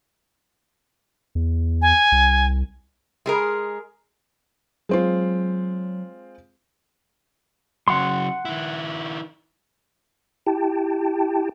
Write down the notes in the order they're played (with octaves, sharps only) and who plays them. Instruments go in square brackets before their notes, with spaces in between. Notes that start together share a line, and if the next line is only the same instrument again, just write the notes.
[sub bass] E2
[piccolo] G#5
[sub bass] C2
[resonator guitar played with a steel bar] G#3 G#4 A#4
[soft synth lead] F#3 [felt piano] G#3 C4 F4
[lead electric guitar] C#3 F#3 [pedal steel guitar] F#5 C6
[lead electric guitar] D#3 E4
[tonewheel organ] E4 G4 G5 A5